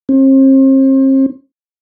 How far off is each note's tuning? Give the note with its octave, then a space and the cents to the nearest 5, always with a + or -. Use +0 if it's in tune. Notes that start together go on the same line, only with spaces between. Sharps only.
C4 +40